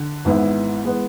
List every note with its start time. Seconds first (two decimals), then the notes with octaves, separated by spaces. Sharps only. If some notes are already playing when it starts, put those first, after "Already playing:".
Already playing: D3
0.25 G#1 G#2 E3 B3 E4
0.84 E3 G#3 B3